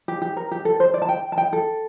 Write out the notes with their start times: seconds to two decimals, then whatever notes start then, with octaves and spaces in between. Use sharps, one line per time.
0.08 G4
0.22 G4
0.37 A#4
0.51 G4
0.65 A4
0.80 C5
0.94 D5
1.02 A5
1.09 G5
1.32 A5
1.38 G5
1.53 A4